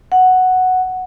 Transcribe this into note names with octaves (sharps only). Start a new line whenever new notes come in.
F#5